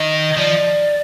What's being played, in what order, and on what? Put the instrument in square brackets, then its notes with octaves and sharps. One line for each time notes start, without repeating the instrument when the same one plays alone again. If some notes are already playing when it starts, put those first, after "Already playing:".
Already playing: [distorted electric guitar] D#3 [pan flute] D#5
[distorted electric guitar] F3 [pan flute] D5